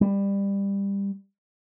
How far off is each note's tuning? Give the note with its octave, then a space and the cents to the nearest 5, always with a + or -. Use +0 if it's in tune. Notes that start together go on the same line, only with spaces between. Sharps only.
G3 +20